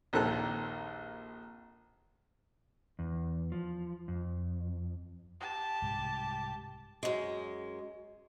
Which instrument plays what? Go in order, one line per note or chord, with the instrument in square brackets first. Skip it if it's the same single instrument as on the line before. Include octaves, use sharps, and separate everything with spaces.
[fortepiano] A#1 D#2 D#3 C4 A4 F#6
[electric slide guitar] E2
F3
F2
[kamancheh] G4 A5
[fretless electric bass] C2 G#2
[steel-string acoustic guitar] F#2 G#3